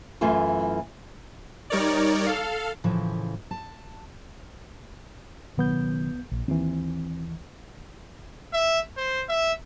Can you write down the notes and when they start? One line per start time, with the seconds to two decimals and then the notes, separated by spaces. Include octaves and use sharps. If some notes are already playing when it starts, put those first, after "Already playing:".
0.21 F#2 E3 A3 F4 G#5
1.70 G3 D#4 A#4 C#5 D5
2.26 A4 F5
2.84 A2 C#3 E3 F3
3.51 A5
5.57 C#2 B2 D#3 F#3 B3 G6
6.32 A#1
6.48 D#2 E3 C4
8.53 E5
8.97 C5
9.29 E5